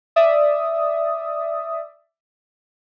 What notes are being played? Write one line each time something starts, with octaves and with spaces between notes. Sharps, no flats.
D5 E5 D#6